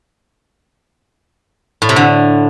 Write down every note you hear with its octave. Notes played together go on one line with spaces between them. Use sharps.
A2
C3
D3